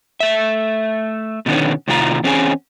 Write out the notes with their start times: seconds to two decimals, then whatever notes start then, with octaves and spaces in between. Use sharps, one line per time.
0.20 A3 E5
1.46 B2 D3 D#3 A#3 B3 C#4
1.88 A2 C3 D#3 F4 A#4 A#5
2.23 E2 C4 C#4 F4 G#4 G#5